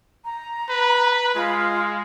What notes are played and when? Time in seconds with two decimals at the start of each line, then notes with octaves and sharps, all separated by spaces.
0.25 A#5
0.70 B4
1.35 G#3 F4